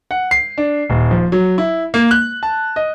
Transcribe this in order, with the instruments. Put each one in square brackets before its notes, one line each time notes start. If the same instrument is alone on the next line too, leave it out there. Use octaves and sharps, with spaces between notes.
[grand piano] F#5
C7
D4
D#1
F3
F#3
E4
A#3
F#6
A5
D#5